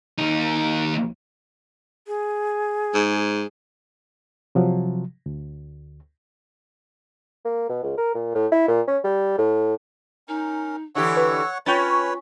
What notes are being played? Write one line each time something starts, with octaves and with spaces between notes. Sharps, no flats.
D#2 D#4
G#4
G#2
C3 F3 F#3
D2
A#3
B2
C#2
A#4
A#2
A2
E4
A#2
C#4
G3
A2
C#4 D#4 A#4
D3 E3 G4 C#5 F#5 C#6 E6
B4
C#4 F4 B4 C#5 G5 A6